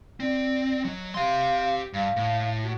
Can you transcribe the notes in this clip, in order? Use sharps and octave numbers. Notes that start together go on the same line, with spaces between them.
C4 D5
F#3 D#5
G4 F5 C6
G2 F5
A2
F#4